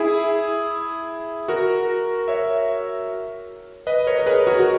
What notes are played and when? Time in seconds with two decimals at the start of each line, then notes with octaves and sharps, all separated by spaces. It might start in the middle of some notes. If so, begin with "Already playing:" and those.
Already playing: E4 G#4
1.48 F#4 A#4
2.28 C#5 E5
3.87 B4 D#5
4.07 A#4 C#5
4.19 A#4
4.26 G#4 B4
4.47 F#4 A#4
4.60 F#4